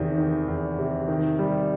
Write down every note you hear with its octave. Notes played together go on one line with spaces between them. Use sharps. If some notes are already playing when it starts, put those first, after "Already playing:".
Already playing: E2 C3 D#3
D#3
E2
C3
D#3
G3